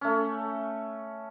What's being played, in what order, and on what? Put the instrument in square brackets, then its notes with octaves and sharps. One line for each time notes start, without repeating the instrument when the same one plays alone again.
[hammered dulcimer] A3 C#4